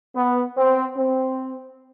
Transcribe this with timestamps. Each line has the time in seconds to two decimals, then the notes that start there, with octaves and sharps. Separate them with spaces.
0.15 B3
0.56 C4
0.97 C4